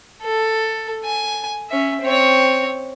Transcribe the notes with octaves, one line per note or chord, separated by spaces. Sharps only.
A4
G#5
C#4 E5
C4 C#5